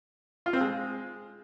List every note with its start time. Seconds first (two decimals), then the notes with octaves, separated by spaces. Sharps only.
0.46 F4
0.53 C4
0.61 G#3